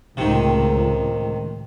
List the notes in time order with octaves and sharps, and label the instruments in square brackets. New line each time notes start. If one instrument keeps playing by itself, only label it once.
[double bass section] C#2 A2 [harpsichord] C3 D#3